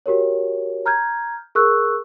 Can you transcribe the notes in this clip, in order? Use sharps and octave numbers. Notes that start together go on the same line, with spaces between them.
F#4 G4 A#4 C#5
A#5 F6 G6 G#6
G#4 A#4 C#6 E6 F#6